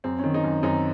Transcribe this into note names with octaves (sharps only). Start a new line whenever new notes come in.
F#2 C4
D#3 C#4
C4 D#4
F#2
F#2 C4 D#4